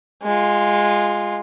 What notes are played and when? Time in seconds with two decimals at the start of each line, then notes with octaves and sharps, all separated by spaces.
0.23 G#3 F4